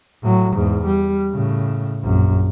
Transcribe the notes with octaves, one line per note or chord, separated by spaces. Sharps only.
A2 F#3
E2 G#2
G3
A2 C#3
A#1 F#2